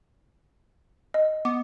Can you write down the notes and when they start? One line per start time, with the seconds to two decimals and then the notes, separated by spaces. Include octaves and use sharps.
1.14 D#5
1.45 B3 D6